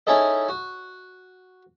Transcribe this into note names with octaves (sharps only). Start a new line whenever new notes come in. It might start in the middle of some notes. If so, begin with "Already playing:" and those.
C#4 D#4 E4 G#4 A4 D#5
F#4